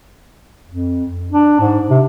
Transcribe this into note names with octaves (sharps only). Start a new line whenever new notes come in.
F2
D4
G#2
C3